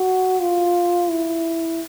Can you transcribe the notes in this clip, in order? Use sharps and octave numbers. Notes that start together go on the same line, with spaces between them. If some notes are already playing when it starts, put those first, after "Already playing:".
Already playing: F#4
F4
E4